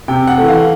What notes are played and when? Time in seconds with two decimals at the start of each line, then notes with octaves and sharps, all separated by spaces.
0.08 C3 G5
0.27 F#5
0.38 E3 A3
0.48 F5